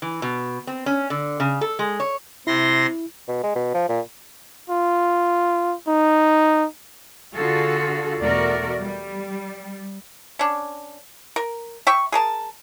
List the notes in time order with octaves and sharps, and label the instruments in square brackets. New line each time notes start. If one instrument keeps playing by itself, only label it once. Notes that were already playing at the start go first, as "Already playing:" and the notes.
[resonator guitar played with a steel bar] E3
B2
C4
C#4
D3
C#3
A4
G#3
C#5
[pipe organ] C3 C6 A#6 [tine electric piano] E4
[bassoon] B2
G#3
B2
F3
A#2
[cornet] F4
D#4
[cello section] D3 F4 F#4 G#4 A4
E2 B2 A3 F#4 A#4 D5
G3
[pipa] C#4 D4
A#4
E5 G5 C#6
G#4 A#4 A5